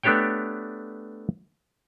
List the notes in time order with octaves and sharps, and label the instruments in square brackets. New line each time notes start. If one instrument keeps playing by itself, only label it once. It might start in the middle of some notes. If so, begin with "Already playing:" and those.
[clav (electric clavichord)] A3 B3 D4 G4 C#5 G5